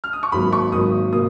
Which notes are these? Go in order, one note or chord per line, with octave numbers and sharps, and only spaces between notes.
F6
D#6
C#6
G#1 G#2 F#3 A#3 B5
C#6
G#1 G#2 F#3 A#3 D#6
B2 A#3 D#6